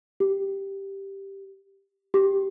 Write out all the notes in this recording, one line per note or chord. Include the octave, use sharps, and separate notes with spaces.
G4
G4